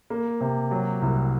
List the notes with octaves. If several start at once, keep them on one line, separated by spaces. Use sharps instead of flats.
A#3
C3
F#3
C2